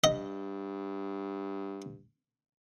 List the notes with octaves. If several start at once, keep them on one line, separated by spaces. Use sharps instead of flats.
G2 D#5